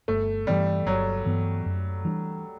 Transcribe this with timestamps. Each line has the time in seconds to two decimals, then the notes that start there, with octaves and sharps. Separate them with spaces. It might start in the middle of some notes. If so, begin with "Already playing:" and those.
0.08 G1 A3
0.47 G2 E3 G3 B3
0.86 G1 F#3
1.26 G2 E3 B3
1.66 F#2
2.05 E3 G3 D4